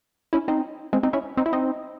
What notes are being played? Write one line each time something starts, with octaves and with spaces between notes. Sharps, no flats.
C#4 E4
C4 D#4
G#3 C4
C4 D#4
C#4 E4
C4 D#4
E4
C4 D#4